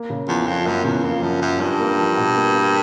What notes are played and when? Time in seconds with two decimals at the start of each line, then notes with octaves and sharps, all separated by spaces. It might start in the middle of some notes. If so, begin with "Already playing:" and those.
Already playing: A#3
0.10 C#3
0.28 E2 F3
0.47 F2 F3
0.66 F#2 A#3
0.85 E2 C#3
1.04 F2 A#3
1.23 F#2 F3
1.42 F#2 F3
1.60 G2 D4
1.80 A#3
1.99 F3
2.17 B2
2.36 A#3
2.55 A#3